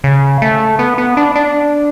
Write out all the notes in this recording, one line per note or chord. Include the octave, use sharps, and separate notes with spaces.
C#3
A3
B3
B3
D4
D4